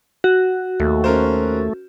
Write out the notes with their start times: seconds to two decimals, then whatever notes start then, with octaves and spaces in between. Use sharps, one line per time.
0.24 F#4
0.80 D#2 A3
1.04 C#4 A#4 C5